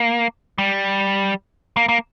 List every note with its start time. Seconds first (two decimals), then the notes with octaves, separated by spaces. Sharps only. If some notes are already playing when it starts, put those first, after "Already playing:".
Already playing: A#3
0.58 G3
1.76 A#3
1.89 A#3